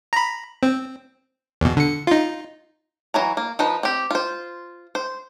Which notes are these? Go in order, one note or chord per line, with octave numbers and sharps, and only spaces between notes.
A#5 B5
C4
E2 B2
D3 C#7
D#4 F4
E3 F#3 A#5
A#3
F3 D#4 B4
C4 G4
F4 C5
C5